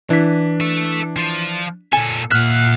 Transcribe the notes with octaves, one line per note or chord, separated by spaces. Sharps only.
E3 D4 B6
A4 E5
F3
A#2 A4 G#5
A#2 E5 F#5 F6 F#6